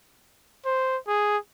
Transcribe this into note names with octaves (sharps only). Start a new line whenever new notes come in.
C5
G#4